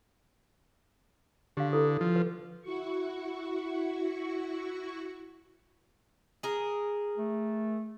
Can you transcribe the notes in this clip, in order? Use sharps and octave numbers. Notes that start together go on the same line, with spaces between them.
D3 G4 F5
E4 A4 B4
F3
B4
E4 F#4 C#6
G#4 A#4
A3